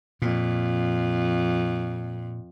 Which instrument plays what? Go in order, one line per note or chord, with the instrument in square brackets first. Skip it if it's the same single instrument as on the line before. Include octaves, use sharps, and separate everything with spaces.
[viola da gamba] F2 [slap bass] A#2